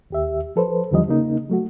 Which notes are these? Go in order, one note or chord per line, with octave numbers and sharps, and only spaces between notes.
D#2 G4 E5
F3 A4 B4 C5
E2 D3 D#3 F3 G3 D#5
C#3 A#3 D#4
F#3 A3 F#4